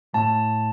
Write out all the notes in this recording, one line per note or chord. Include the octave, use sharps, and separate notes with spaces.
A2 A5